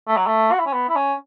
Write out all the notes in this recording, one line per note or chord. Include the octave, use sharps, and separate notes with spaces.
A3
F#3
A3
F#4
E4
C#4
B3
E4
C#4